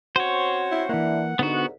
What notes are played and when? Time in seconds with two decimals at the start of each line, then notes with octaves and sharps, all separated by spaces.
0.16 C4 C#4 F#4 C5 C#5
0.71 E4
0.89 E3 A#3 D4 E4 F#5
1.39 C2 G#2 D3 B3 D#4 F#4